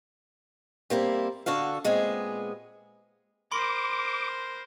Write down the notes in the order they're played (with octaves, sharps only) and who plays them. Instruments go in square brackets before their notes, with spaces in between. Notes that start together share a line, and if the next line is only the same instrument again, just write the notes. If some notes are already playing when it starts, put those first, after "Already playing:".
[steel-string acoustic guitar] G3 A#3 C4 E4
D3 F#4 A4 F5
A#2 G#3 B3 C4 G#4
[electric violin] A#4 C5 [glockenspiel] B5 C6 [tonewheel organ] D6